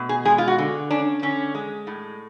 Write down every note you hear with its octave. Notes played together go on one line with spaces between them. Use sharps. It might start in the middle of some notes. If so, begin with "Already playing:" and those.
Already playing: B2 A3
G#4
G#3 G#4
F4
F#4
D3
C#4 D4
D3 C#4
G#3
A2